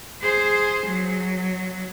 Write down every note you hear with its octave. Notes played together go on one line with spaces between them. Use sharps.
G#4 C5
F#3